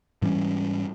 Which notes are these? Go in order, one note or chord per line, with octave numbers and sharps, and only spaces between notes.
G#2 E3 G3 C#4